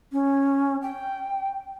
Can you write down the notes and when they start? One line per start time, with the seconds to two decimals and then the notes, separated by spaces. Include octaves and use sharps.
0.13 C#4
0.82 G5